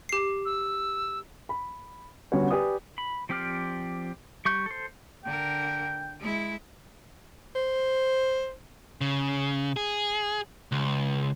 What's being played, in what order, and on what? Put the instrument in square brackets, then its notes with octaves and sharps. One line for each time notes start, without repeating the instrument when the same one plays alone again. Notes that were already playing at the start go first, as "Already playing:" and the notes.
[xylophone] G4 C7
[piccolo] E6
[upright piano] B5
D3 G3 B3 C#4 F#4 C#5
G4 B4 D5 G#5 D#6
[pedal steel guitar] B5
F3 C4 G4 D5 F6
G3 C#6 G6
A4 C5
[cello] D3 A#4 [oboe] G5
[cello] G#3 E4
[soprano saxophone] C5
[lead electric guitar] C#3
G#4
C#2